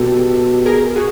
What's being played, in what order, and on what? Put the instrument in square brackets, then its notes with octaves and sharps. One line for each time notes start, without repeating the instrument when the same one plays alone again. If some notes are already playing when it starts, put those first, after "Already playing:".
Already playing: [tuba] B2 [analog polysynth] G4 A4
[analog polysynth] G#4 A#4
F#4 G#4